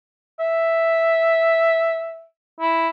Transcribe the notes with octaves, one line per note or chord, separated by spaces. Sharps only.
E5
E4